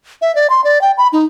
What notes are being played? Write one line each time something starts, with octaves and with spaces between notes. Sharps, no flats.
E5
D5
C6
D5
G5
B5
D#4